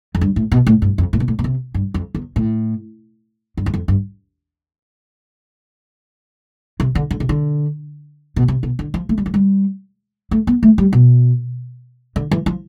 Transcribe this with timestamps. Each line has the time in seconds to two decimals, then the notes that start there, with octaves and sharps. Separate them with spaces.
0.15 F2
0.21 G2
0.36 A2
0.52 B2
0.67 A2
0.82 G2
0.98 F2
1.13 A2
1.20 B2
1.28 A2
1.39 B2
1.44 C3
1.74 G2
1.94 F2
2.15 E2
2.36 A2
3.57 G2
3.66 E2
3.74 F2
3.88 G2
6.80 C3
6.95 D3
7.11 D3
7.20 C3
7.29 D3
8.36 B2
8.48 C3
8.63 B2
8.79 D3
8.94 F3
9.09 A3
9.18 G3
9.26 F3
9.34 G3
10.31 A3
10.47 B3
10.63 A3
10.78 G3
10.93 B2
12.16 D3
12.31 E3
12.46 F3